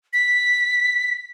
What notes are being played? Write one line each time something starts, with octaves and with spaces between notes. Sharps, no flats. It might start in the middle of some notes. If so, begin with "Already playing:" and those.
B6